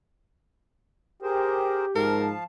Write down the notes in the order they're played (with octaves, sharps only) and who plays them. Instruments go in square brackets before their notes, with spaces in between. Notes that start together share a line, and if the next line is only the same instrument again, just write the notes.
[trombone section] G4 [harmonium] G#4 A#4 C5
[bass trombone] G#2 [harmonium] F3 F5 A5 [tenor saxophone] A#4